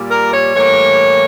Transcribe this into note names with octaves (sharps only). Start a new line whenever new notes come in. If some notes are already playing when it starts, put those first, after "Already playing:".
Already playing: A#2 G3
A#4
C#5
A2 E3 G3 A#3 C#5